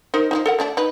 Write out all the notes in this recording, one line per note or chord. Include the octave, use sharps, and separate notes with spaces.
D#4 A#4 C5
F3 D4 D#4
A4 A#4 F#5
D3 A3 D4
D#4 B4